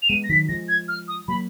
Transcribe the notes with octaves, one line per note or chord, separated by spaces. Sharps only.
F7
G#3 B3 D#7
A#6
D#3 F#3 B6
F3 G#3 A#6
G#6
F6
D#6
F#3 A#3 B5